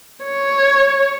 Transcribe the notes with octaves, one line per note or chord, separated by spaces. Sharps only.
C#5